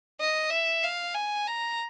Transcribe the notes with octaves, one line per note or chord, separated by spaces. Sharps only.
D#5
E5
F5
G#5
A#5